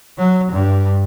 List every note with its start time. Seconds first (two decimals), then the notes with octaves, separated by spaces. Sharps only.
0.18 F#3
0.52 G2